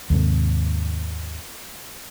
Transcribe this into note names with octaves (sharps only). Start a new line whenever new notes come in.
D#2 G#2 C3